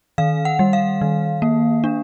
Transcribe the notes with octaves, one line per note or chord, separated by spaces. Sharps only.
D#3 F5
F#5
G3
F5
D#3
A#3
D4